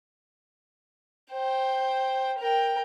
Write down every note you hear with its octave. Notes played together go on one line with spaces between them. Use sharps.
C5 G5
A#4 G5